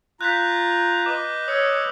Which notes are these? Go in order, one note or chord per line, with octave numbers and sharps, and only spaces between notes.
F4 A#5 F#6 G6 B6
B4 D#5 D6
C#5 D#6 E6